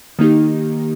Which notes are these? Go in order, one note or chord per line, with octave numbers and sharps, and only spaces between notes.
D#3 A#3 D#4 G4